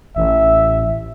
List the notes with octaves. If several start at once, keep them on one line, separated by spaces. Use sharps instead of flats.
A1 E5